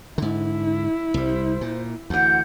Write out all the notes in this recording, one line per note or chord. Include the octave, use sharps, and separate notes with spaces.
G#2 D3 E4
C2 G3 C5
A#2
D2 E3 F#5 G6